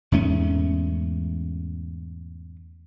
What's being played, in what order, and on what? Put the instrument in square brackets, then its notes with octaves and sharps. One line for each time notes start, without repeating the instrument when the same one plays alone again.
[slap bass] E2 G#2 A3 C#4